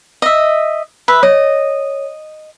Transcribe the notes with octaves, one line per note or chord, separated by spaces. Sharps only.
D#5 E5
B4 E5
C#5 D#5